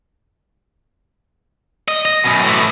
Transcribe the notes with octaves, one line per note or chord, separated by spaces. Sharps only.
D#5
D#5
F#2 B2
A2 E3